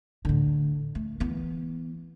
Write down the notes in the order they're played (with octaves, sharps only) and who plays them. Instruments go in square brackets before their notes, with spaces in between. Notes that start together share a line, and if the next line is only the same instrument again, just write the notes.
[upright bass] A2 D3
A3
E3 B3